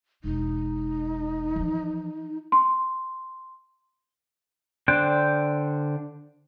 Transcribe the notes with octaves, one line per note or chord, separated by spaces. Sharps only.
E1 D#4
E3 F3
C6
D3 D4 C5 G5 F#6